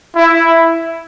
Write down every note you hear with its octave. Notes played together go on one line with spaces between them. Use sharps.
E4